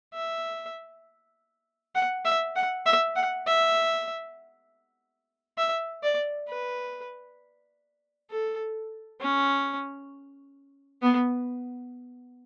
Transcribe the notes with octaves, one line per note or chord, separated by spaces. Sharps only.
E5
F#5
E5
F#5
E5
F#5
E5
E5
D5
B4
A4
C#4
B3